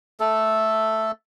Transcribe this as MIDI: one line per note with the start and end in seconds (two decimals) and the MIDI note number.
0.20 1.12 57
0.20 1.12 69